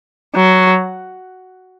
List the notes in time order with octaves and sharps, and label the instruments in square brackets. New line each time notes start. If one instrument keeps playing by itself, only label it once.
[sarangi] F#3